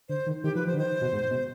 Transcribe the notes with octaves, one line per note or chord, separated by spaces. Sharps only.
D3 C5
D#3
D#3 G4
F3 B4
F3 C5
D3
D#3 C5
B2
G#2
B2